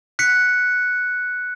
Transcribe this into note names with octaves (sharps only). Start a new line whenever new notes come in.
F#6 B6 C#7